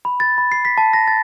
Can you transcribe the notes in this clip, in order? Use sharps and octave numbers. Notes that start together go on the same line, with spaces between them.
B5
A6
B5
C7
B6
A5
A#6
A6